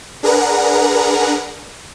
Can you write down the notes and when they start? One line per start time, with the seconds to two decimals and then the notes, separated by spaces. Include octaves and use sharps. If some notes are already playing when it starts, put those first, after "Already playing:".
0.23 D4 G#4 A#4 B4 F#5 A#5